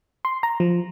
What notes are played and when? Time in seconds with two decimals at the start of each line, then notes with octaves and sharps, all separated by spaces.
0.25 C6
0.43 A#5
0.60 F3